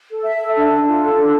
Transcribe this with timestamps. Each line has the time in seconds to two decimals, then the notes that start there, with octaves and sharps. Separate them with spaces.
0.09 A4
0.25 E5
0.41 A4
0.55 D4
0.72 D4
0.88 F4
1.02 A4
1.19 D4